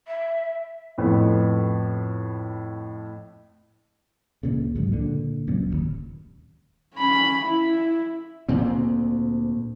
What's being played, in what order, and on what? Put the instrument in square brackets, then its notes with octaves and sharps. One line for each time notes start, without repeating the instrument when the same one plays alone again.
[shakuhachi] E5
[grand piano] F2 A2 B3
[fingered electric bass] C#2 A#2 C#3
C#2 G#2 F#3
A#2 D3
C#2 F#2 A#2
D1 G#1 D#2
[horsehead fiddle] C#4 B5
E4
[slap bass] D2 A#2 C4